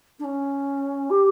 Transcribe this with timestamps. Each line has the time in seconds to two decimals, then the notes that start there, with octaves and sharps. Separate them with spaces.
0.19 D4
0.24 C#4
1.10 G4